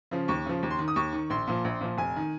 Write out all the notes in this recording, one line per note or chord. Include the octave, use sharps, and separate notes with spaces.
C#3 F3
D#2 C#6
C#3 F3
D#2
C6
D#3
D#6
D#2 C#6
D#3
A#1 C6
A#2 F3
A#1
A#2 F3
F1 G#5
D#3